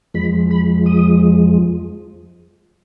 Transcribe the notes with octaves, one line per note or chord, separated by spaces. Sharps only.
F2 F3 G#3 B5
B5
D#6